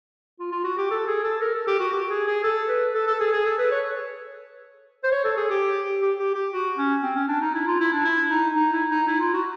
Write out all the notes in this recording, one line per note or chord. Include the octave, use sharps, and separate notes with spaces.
F4
F4
F#4
G4
A4
G#4
A4
A#4
A4
G4
F#4
G4
G#4
G#4
A4
B4
A4
A4
G#4
G#4
A4
B4
C#5
C5
C#5
A4
G#4
G4
G4
G4
G4
F#4
C#4
C4
C#4
D4
D#4
E4
F4
E4
D4
E4
D#4
D#4
E4
D#4
E4
F4
F#4